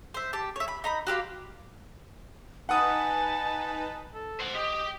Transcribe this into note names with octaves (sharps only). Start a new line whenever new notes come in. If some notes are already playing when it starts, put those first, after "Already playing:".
C5 E5
G4 A5
C#5 E5
B5
D#4 A#5 B5
F#4 G4 F5 C6
D#4 B4 F#5 G#5 A5 D#6
A4
C5 F#5
G4 D#5